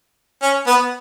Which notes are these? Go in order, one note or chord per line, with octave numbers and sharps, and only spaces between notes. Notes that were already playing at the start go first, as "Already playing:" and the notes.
C#4
B3